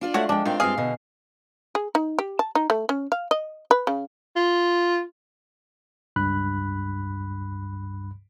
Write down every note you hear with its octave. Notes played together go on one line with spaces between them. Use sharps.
D4 F4 D5
A3 F#4 C#5 E5 F#5
F3 G#3 D4 G5
D#3 C4 D4 F4
G2 C4 F4 G#4 F5
B2 D3
G#4
D#4
G4
A5
D#4
A3
C#4
F5
D#5
B4
C#3
F4
C#2 G2 B5 F#6